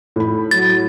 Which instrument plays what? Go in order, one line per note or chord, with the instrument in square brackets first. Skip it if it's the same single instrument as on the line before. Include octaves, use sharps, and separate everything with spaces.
[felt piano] A2 B5
[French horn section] F#3 [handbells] A6